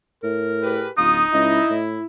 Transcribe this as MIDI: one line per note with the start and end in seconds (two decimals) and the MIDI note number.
0.23 0.86 45
0.23 0.87 70
0.62 0.90 67
0.62 0.90 68
0.62 0.90 71
0.98 1.24 26
0.98 1.74 63
0.98 1.20 65
0.98 1.26 87
1.34 1.60 37
1.34 2.06 64
1.34 1.79 75
1.70 1.98 45